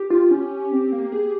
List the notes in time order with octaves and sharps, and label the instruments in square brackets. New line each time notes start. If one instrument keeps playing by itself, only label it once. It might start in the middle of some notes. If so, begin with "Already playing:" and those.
Already playing: [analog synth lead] G4
[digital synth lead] F4
C#4
C4
A#3
G#4